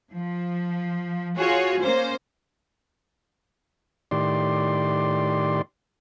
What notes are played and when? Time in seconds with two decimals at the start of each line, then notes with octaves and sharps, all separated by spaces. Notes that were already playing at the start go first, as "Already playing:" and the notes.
0.13 F3
1.37 F4 F#4 G#4 C#5
1.80 A#3 C#4 C5
4.11 A2 D#3 G4 D5 C6